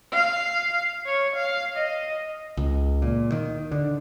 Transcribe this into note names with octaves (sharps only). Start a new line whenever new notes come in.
F5
C#5
F5
D#5
C#2
A#2
D#3
D3